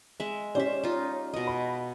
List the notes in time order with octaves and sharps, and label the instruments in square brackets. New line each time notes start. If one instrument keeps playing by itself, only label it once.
[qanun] G#3 E5
[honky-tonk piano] C#4 G4 D5 [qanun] C5 E5
[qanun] D#4 F4
B2 D#5
[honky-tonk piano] B5